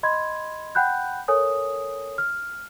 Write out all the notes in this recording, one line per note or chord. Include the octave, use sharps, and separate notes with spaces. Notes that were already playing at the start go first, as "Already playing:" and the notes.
D#5 B5 C6 G#6
F#5 G5 B5 F#6 G6
A4 A#4 C#5 G#5 D#6
F6